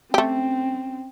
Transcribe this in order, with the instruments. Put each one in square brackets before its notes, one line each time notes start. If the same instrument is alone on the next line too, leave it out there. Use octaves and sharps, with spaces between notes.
[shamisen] A3 G4 [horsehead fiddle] C4 C#4